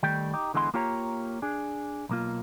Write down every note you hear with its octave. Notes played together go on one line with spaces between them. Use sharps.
D#3 G3 A3 G5
D#4 G4
D3 E3 G#3 B3 E4 C6
A#3 F4 G4 C#5 A#5
D4 G#4
B1 A#3 F4